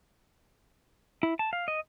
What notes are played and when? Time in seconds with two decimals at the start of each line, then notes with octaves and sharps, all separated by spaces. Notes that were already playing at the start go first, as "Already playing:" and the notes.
1.23 E4
1.39 A5
1.53 F5
1.68 D#5